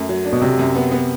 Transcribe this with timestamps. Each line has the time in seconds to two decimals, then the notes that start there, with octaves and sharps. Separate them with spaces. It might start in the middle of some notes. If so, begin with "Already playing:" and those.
Already playing: F#2 A3
0.09 F#3
0.25 D4
0.33 B2
0.42 C3 F#3
0.59 F#2
0.75 B3
0.92 B3